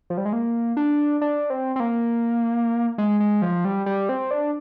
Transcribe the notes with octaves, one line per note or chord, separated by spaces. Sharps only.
F3
G3
G#3
A#3
D4
D4
C4
C4
A#3
G#3
G#3
F3
G3
G3
C4
D4